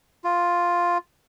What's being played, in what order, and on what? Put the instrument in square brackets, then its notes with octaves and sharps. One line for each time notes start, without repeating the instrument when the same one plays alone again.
[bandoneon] F4